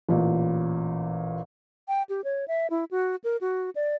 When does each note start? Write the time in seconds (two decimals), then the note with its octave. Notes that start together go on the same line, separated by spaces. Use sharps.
0.09 A1 A#2
1.88 G5
2.09 G4
2.24 C#5
2.48 E5
2.70 E4
2.91 F#4
3.24 A#4
3.41 F#4
3.75 D5